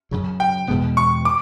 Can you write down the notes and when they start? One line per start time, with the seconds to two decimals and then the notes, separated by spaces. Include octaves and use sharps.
0.11 F#2 C#3 F#3
0.40 G5
0.68 E2 B2 G#3 B3
0.97 C#6
1.25 D6